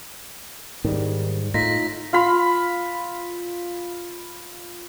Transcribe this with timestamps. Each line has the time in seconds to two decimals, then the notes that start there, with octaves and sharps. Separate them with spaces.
0.84 G#2 D#3 G3
1.54 A2 D#4 F4 A#6 B6
2.13 F4 F5 B5